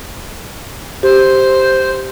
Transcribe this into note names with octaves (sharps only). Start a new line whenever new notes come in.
G4 C5